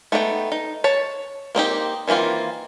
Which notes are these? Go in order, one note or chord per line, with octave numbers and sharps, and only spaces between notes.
A3 B3 D#4 D5 G5
D#4
C#5 A5
A#3 C4 D#4 G4
D#3 E3 A#3 C4 F4